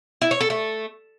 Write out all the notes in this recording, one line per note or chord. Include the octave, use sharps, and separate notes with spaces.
E4
C#5
A4
A3